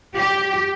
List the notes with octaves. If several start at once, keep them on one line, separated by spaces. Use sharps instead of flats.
G4